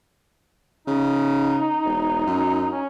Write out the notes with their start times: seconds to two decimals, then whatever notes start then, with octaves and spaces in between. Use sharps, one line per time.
0.88 C#3 D#4
1.85 E1
2.26 F#2
2.73 C#4